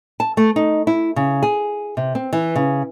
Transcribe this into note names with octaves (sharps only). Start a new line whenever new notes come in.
A5
A3
D#4
E4
C#3
G#4
C3
C4
E3
C#3